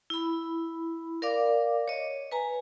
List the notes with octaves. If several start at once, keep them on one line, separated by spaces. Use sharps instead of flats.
E4 B5
A#4 D5 F5 D6
C#5 D#5
B4 G#5 A#5